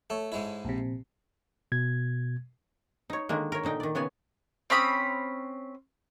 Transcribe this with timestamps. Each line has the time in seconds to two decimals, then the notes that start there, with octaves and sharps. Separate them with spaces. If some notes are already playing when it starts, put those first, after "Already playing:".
0.10 A3 A4 C#5
0.32 G#2 G#3 E4
0.65 A#1 C3
1.72 B2 G#6
3.10 D#4 C#5
3.29 D3 D#3 G#3 A#3
3.52 A#4 C#5
3.63 A#2 D3 D#4 G5
3.80 D#3 D5
3.95 C#3 B3 C#5 G#5
4.70 C4 C#4 B5 D#6